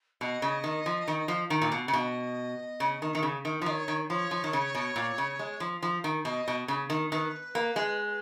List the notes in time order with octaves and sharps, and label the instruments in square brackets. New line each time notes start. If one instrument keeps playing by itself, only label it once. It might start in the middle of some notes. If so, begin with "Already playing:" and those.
[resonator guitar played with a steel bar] B2 [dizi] D#5
[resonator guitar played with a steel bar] C#3
D#3
F3
D#3
F3
D#3
A#2
B2
C#3
[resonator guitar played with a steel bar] B2 [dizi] D#5 F5
[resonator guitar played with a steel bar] C#3
D#3
D#3
C#3
D#3
F3
[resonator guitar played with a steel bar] D#3 [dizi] C#5 D#5
[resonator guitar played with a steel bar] D#3
[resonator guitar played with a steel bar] F3 [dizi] C#5
[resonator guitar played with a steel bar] F3
D#3
C#3
B2
A#2
C#3
G#3
F3
F3
D#3
[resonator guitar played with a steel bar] B2 [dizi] D#5
[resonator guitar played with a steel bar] B2
C#3
D#3
[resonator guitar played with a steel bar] D#3 [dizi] B4
[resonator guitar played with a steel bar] A#3
G#3